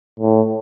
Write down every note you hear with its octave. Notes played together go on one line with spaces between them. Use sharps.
A2